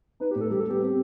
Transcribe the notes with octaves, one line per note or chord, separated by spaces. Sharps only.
D#4 B4
G4
A2
A4
G3 G4
A4
B3 G4
C4